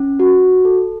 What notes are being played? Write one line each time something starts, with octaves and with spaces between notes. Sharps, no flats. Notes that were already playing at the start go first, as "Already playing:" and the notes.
Already playing: C#4
F#4
A4